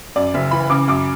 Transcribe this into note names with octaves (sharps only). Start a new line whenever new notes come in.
F#2 D5
F#1 E5
E3 B5
C#3 D6
F#2 D6